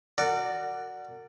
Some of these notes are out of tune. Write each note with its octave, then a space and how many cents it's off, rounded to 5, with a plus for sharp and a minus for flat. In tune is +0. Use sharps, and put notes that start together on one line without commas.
F#4 +0 A#4 -35 D5 +0